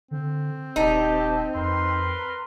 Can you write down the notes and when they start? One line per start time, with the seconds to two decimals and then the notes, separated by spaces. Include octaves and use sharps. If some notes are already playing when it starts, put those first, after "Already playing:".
0.11 D3 C4
0.76 D#1 D#4 G4 A5
1.55 F2 A#4 B4 C6